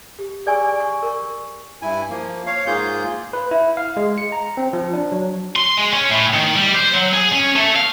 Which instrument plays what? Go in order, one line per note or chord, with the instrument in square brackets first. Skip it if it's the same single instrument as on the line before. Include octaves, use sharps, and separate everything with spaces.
[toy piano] G4
G#4 D5 G#5 C#6 E6
G#5
C#6
A#4 C#6
[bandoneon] G2 E4 G#5
F3 A#3
C#5 F5
G#2 A#3 F4 G#4 G6
[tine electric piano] B4
E4
F5
G#3
C#7
A#5
C4
F3
D4
F#3
[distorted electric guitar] C6
G#3
C#4
A2
D#3
G3
C5
F#3
G#4
C#4
A3
F5